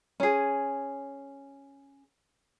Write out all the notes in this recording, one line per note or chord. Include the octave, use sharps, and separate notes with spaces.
C#4 G#4